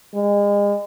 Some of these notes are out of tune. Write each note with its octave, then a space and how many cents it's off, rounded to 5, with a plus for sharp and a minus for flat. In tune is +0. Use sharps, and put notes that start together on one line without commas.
G#3 -35